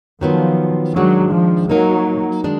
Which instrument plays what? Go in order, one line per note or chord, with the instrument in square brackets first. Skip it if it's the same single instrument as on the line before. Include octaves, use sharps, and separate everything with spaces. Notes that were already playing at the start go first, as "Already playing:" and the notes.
[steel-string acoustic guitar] D#3 F#3 B3 F4 [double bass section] F3
[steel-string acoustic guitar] D#3 G#3 D4 [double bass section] F#3
[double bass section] F3
[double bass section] F#3 [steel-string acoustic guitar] A#3 D#4 A#4
[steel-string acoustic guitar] D#3 G#3 D4